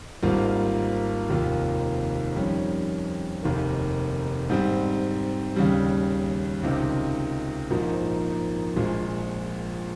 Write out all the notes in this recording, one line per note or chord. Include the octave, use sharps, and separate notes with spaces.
G#1 G#2 G3 A#3 F4
F1 D#2 D#3 A#3 F4
F2 D#3 G3 C#4
F1 D#2 D#3 A#3
G#2 G3 C4
D#2 C#3 G3
C#2 C3 D#3
A#1 G#2 F3 A#3 D#4
A#1 A#2 F3 G#3